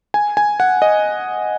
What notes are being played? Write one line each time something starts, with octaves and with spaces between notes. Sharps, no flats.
G#5
G#5
F#5
D#5